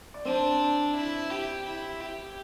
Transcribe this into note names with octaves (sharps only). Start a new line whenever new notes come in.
D5
C4 D4 C5
E4
G4
E4
G4